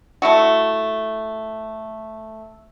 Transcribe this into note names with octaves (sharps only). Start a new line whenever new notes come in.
A3 E4 F#4